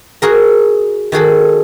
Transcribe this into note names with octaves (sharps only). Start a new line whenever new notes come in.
F#4 G#4 A#4
D#3 F#4 G#4 A4